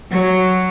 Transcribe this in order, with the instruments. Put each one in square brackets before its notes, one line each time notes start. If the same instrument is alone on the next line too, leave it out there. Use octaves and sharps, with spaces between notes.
[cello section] F#3